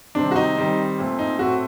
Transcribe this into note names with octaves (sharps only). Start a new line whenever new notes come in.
C3 D#3 G3 C4 D4
F#4
D#4
D#3 G3 C4
A#2 A3 C4
D#4
A2 A3 C4 F#4